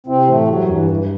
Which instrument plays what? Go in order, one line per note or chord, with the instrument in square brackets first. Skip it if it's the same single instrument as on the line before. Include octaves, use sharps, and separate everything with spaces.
[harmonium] C3 C4 [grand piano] E4
[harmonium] A2 A3 [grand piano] E3
[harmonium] F#2 F#3 [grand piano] G3
[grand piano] G2 [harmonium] E3
[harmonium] E3 [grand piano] G3